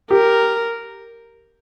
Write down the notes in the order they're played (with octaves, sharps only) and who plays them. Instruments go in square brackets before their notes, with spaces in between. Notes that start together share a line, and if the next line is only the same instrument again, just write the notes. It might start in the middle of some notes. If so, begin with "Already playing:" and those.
[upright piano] G4 [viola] A#4